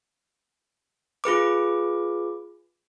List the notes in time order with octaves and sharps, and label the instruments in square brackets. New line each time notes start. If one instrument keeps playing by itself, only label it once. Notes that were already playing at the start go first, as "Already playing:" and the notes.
[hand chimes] F4 G#4 B4 D6